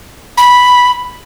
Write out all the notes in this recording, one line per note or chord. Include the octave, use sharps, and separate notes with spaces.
B5